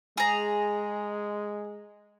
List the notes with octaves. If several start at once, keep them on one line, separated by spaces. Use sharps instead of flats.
G#3 G#4 A#5